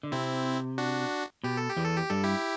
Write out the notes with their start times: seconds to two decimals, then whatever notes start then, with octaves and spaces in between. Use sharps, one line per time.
0.03 D3
0.12 C3 C4 E4
0.78 D4 F#4
1.44 B2 G4
1.57 A4
1.70 G4
1.77 E2 E3
1.84 A4
1.97 G4
2.10 G2 G3 A4
2.24 E4 G4